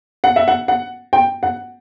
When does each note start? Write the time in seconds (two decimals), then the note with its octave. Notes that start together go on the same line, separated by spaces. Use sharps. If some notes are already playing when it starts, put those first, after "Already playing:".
0.24 F#5
0.36 E5
0.48 F#5
0.68 F#5
1.13 G5
1.43 F#5